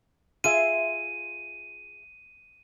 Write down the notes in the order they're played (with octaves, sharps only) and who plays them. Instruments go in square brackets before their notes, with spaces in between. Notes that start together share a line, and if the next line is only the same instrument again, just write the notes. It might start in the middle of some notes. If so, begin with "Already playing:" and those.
[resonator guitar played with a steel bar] F4 G#4 E5 [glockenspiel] D#7